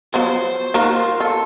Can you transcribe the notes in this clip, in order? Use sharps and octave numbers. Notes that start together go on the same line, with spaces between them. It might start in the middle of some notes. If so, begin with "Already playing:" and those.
F3 F#3 B3 C5
A#3 D#4 F#4 A#4
F4
F4 A4